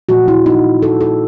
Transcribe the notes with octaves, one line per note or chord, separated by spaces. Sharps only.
A#2 F3 A3 F#4
E4
D#4
A4
A4